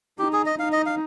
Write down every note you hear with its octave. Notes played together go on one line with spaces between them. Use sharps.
D#4 G4
G#4
D#5
D#4 F5
D#5
F5